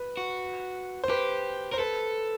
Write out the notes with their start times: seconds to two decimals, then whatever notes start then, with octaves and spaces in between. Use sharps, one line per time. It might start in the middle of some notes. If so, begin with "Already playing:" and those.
Already playing: B4
0.17 F#4
1.04 C5
1.09 G4 B4
1.72 A#4 C5
1.79 A4 B4